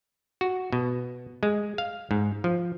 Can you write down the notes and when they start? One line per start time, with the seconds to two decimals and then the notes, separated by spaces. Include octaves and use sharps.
0.41 F#4
0.73 B2
1.43 G#3
1.78 F5
2.11 G#2
2.44 F3